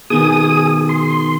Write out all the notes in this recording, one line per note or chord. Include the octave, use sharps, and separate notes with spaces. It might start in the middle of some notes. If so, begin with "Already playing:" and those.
B2 D#3 B3 G#4 D#6
C6